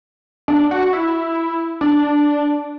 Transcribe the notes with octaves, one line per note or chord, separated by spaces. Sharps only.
D4
F#4
E4
D4